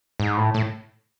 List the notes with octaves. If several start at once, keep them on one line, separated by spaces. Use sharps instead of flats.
G#2
A2
A2